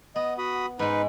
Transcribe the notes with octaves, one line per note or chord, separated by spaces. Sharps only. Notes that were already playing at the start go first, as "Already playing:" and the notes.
B3 D#5
F#4 B5 D#6
G#2 G#3 D#4 B4